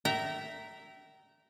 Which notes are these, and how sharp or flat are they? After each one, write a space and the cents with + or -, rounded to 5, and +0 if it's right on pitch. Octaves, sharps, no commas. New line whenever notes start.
E5 +0 G5 -30 A#5 +0